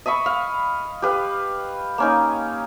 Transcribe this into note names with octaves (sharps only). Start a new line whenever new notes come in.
D#5 E5 B5 C#6
F5
G4 B4 F5
A#3 C#4 D#4